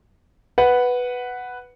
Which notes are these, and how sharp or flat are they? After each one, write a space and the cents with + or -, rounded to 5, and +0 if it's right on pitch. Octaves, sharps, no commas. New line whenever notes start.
B4 +0 F#5 +0